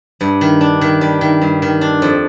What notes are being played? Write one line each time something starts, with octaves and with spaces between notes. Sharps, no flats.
G2
D#3
D4
D#3
G3
D#3
G2
D#3
D4
F2